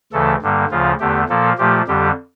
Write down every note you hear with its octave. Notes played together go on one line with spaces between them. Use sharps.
D2 C#3 E3 A3 A4
G2 D3 G3 A#3
D2 C#3 F3 F4
E2 D3 A3 G4
A#2 F3 A#3 A4
A#2 F3 A3 G4
F2 D3 G3 G4